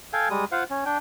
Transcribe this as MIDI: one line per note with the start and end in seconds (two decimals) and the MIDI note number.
0.13 0.29 69
0.13 0.29 77
0.13 0.29 79
0.13 0.29 80
0.30 0.45 55
0.30 0.45 56
0.30 0.45 87
0.52 0.64 65
0.52 0.64 72
0.52 0.64 77
0.52 0.64 78
0.70 0.84 61
0.85 0.98 62
0.85 0.98 79